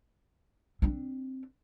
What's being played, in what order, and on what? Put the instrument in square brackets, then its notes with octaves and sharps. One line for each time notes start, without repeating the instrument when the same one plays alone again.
[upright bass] C4 D4